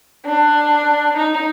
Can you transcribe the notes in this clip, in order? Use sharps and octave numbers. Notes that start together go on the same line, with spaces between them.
D4
D#4